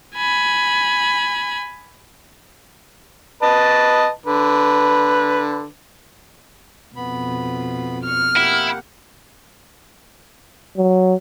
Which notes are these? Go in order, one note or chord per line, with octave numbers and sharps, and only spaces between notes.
G#5 B5
B4 D#5 A5
D3 B4
F2 B2 B3 B5
C#6 F6
A#3 E4 G4 F#5
F#3